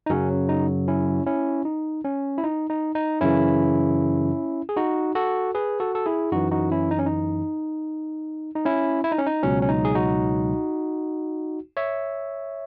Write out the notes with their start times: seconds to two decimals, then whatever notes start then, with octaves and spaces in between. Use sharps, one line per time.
0.06 D#4
0.10 F#2 C#3 F#3 C#4
0.49 D#4
0.88 C#4 E4
1.26 C#4 E4
1.65 D#4
2.05 C#4
2.38 E4
2.44 D#4
2.70 D#4
2.95 D#4
3.21 F#2 C#3 E3 C#4 E4
4.69 G#4
4.77 D#4 F#4
5.15 F#4 A4
5.55 G#4 B4
5.80 F#4 A4
5.95 A4
6.06 E4 G#4
6.32 F#2 E3 D#4 F#4
6.51 D#4 F#4
6.72 C#4 E4
6.91 D#4
6.99 C#4
7.06 D#4
8.55 D#4
8.65 C#4 E4
9.04 E4
9.12 D#4
9.18 C#4
9.27 D#4
9.43 C#2 B2 F#3 C#4
9.62 C#4
9.69 D#4
9.85 G#4
9.95 D#4 F#4
11.77 C#5 E5